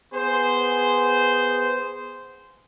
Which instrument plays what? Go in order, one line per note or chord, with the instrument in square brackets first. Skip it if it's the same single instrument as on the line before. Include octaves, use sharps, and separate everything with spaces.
[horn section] B3 G#4 C5